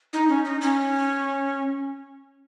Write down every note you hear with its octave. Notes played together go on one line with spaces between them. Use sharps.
D#4
C#4
D#4
C#4